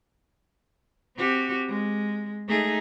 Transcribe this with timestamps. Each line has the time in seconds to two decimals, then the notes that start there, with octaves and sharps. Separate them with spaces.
1.17 C4 F#4 G4
1.68 G#3
2.48 A3 D#4 G#4